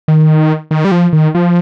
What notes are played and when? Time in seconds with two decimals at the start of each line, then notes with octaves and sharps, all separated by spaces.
0.08 D#3
0.71 D#3
0.85 G3
0.92 F3
1.13 D#3
1.35 F3